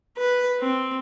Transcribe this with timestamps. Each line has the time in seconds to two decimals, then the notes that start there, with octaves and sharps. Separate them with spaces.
0.18 B4
0.60 C4